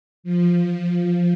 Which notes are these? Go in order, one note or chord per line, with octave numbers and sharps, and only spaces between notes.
F3
F3